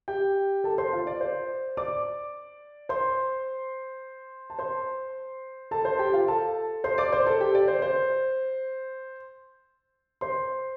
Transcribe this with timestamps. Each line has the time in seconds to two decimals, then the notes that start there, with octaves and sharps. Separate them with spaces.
0.08 G4 G5
0.64 A4 A5
0.78 C5 C6
0.93 F4 F5
1.07 D5
1.21 C5
1.77 D5 D6
2.89 C5 C6
4.50 A5
4.59 C5 C6
5.71 A4 A5
5.85 C5 C6
5.99 G4 G5
6.13 F4 F5
6.28 A4 A5
6.84 C5 C6
6.98 D5 D6
7.12 C5 C6
7.27 A4 A5
7.40 G4 G5
7.55 D5
7.68 C5
7.82 C5
10.21 C5 C6